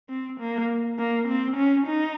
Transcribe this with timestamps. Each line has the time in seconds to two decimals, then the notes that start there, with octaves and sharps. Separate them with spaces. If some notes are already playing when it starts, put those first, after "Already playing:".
0.09 C4
0.40 A#3
0.99 A#3
1.28 C4
1.56 C#4
1.86 D#4